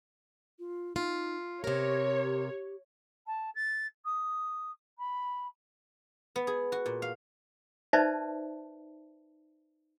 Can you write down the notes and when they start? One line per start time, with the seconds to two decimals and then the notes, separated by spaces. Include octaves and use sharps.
0.59 F4
0.96 D#4 F4
1.64 C3 G4 A#4 C#5
3.26 A5
3.54 A6
4.05 D#6
4.98 B5
6.36 B3
6.47 G#4
6.72 F#4
6.86 A#2
7.02 F5
7.93 D#4 B4 C5 D5 E5 A5